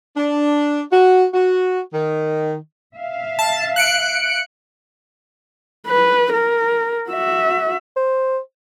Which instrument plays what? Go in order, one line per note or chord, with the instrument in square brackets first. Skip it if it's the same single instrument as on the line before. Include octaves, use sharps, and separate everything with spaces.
[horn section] D4
F#4
F#4
D#3
[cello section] E5 F5
[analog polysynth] A5
F#6 C#7 D7
[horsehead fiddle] B4
A#4
F#4 E5
[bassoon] C5